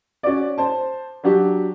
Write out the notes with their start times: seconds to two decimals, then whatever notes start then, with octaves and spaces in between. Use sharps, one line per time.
0.23 C#4 F#4 D5
0.58 C5 A5
1.24 F#3 D4 F#4 G4